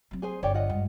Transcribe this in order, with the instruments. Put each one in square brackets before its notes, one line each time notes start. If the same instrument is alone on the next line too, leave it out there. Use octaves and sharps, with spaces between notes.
[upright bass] F#3 C4
[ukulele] G#4 C5 G#5
[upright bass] G1 [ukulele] C#5 D5 G5
[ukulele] F4 D#5 F#5
[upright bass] G2 G#3